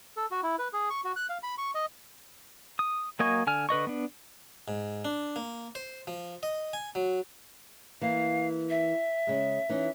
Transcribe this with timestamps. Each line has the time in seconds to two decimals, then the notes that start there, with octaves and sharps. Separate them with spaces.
0.17 A4
0.31 F#4
0.43 E4
0.59 B4
0.73 G#4
0.90 C#6
1.04 F#4
1.16 F#6
1.29 F5
1.43 B5
1.58 C#6
1.75 D#5
2.79 D#6
3.19 F#3 A#3 D#5 G#5 C#6
3.47 D3 G#5 F6
3.69 D3 B4 D#5 C#6
3.87 B3 D4
4.68 G#2
5.05 D4
5.36 A#3
5.75 C5
6.07 F3
6.43 D#5
6.73 G#5
6.95 F#3
8.01 E3 A#3 F5
8.70 E5
9.27 C#3 G#3
9.69 E3 C#4 D#4